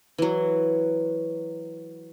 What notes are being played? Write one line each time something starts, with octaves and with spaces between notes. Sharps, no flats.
E3 F#3